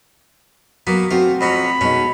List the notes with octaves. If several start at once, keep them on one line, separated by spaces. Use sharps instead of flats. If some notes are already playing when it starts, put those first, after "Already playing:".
F#3 A#3 B3
A3 C4 F4 F#4
F2 F#3 C#4 B5
B2 G#3 C#4 D#4